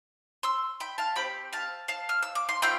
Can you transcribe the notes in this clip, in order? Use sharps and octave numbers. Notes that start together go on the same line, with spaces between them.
C6 E6
G5 B5
F5 A5
C4 G4 G5 B5
F5 A5
F5 A5
F6
E6
D6
C6
A3 C4 F4 G5 B5